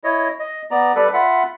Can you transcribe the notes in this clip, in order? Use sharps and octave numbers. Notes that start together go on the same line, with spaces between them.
E4 C#5 D#5
D#5
B3 D5 A#5
G3 A4 B4 D5
F4 E5 F#5 B5